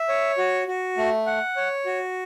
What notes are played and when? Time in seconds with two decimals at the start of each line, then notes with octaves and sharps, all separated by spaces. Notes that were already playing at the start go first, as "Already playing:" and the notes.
Already playing: E5
0.09 C#5
0.38 F#4
0.68 F#4
0.98 A3
1.26 F#5
1.56 C#5
1.86 F#4